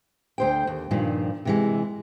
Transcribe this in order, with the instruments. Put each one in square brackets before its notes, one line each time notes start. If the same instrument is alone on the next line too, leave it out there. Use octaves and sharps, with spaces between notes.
[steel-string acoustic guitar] D2 C5 G5
D#2
G2 A#2 D#3 F3
C3 E3 G#3